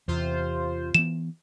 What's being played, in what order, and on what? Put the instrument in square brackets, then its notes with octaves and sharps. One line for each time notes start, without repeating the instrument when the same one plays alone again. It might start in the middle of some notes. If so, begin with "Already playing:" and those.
[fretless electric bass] E2 [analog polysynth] C3 F4 C5
[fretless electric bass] E3 B3 [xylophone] E7